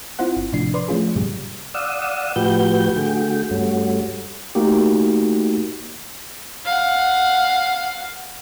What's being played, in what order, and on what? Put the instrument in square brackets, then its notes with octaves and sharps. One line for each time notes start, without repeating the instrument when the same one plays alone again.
[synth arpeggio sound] C4 E4 F4 C5 F#5
G1
A2 C3 F3 D4 C7
B4 D5 C6
F3 A3 C#4 F4 G#4
G2 A#2 C#3 G3
[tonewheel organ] D5 F5 F#5 D#6 E6
A2 F3 F#4 G4 B4 G6
D3 A3 F#4 G#4 G5
G2 G3 A3 C#4 F#4
[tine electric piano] A3 A#3 D#4 F#4 G4
[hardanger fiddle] F5 F#5